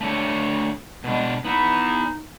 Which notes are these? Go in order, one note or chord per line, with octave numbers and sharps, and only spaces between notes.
A3 D4 C#5
B2 G#3 D4
B3 D#4 E4